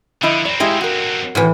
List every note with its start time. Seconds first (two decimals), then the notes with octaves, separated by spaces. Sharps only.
0.22 D3 F3 E4 D#5
0.45 F#3 C4 D5
0.60 G#3 E4 G4 D#5 F5
0.81 F#4 A#4
1.35 A2 C3 D#3 E3 F#4